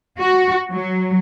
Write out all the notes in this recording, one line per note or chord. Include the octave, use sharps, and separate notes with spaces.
F#4
F#3